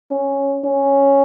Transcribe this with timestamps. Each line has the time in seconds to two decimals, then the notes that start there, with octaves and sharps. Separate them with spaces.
0.11 C#4
0.64 C#4